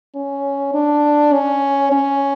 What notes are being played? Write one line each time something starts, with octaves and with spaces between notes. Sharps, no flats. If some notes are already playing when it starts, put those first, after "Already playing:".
C#4
D4
C#4
C#4